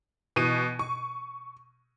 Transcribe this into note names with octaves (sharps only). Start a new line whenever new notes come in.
B2 E3 D#7
C#6